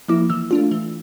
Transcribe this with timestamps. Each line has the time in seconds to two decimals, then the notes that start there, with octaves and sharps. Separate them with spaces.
0.08 F3 A#3 E4 D6
0.30 E3 E6
0.51 A3 D4 F4
0.71 E3